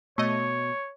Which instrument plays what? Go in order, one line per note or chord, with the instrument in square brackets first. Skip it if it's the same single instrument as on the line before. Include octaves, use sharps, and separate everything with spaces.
[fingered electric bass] B2 [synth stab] A3 D#5 [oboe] C#5